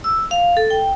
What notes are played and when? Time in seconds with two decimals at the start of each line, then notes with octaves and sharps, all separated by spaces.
0.04 E6
0.31 F5
0.57 A4
0.70 G5